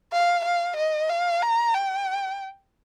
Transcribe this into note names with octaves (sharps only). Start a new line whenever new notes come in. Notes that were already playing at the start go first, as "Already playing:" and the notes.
F5
F5
D#5
F5
A#5
G5